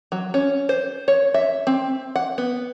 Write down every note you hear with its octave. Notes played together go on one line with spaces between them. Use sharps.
F#3
C#4
C5
C#5
E5
C4
F#5
B3